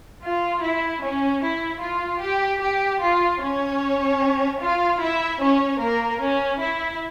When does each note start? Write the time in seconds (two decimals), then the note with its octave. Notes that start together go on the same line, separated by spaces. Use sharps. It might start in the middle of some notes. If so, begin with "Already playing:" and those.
0.24 F4
0.63 E4
1.03 C#4
1.43 E4
1.83 F4
2.22 G4
2.62 G4
3.02 F4
3.42 C#4 C#5
4.61 F4 F5
5.01 E4 E5
5.41 C#4 C#5
5.81 A#3 A#4
6.21 C#4
6.61 E4